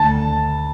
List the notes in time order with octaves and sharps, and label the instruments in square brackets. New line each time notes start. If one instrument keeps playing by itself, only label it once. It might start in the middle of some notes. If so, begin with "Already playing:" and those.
Already playing: [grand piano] D2 A5